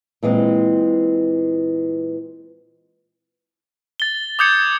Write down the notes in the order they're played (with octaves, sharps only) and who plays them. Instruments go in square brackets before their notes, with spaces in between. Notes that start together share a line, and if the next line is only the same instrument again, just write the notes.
[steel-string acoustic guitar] A#2 E3 G#3 C4
[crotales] A6 G7
D6 D#6 G6 G#6 C#7